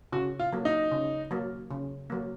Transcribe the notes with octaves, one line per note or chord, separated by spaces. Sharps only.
C#3 F#4
F4
F#3 A#3
D#4
C#3
F#3 A#3
C#3
F#3 A#3